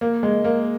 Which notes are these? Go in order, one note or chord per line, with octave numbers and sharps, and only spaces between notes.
A#3
G#3
A#3